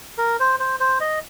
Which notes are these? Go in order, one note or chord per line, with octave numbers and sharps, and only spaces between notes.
A#4
C5
C5
C5
D#5